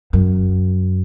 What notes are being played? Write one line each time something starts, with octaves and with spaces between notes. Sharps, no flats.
F#2